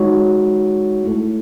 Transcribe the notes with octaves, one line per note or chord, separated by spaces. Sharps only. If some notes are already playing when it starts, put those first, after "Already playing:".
Already playing: G#3 D#4 F#4 C#5
A3 E4 A4